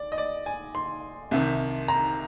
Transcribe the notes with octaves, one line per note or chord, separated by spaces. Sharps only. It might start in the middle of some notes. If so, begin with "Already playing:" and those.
Already playing: D5
D#5
D5
G#5
C6
C2 C3 D#3
A#5